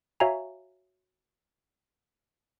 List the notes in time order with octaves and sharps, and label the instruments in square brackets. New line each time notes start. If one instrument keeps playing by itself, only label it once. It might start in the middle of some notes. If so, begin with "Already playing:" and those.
[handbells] F#4 C#5 E5 F5 G#5 A#5